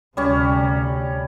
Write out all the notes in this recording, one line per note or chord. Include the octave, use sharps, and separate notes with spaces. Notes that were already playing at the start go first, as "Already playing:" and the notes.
D2 C3 G3 C#4